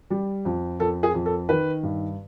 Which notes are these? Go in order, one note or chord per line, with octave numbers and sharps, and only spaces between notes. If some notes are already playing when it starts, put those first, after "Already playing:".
G3
F2
F2 A4
G#4
F2
A4
D#3 B4
G2